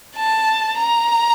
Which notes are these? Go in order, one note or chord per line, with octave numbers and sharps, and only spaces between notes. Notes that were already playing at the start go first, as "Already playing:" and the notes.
A5
A#5